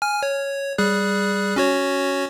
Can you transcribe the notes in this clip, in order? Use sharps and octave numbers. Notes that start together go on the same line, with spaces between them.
G#5 F6
C#5
G3 G#4 F#6
C#4 F#4 C#5